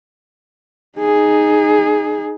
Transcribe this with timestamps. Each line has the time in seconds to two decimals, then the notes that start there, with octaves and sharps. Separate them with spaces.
0.98 D#4 G#4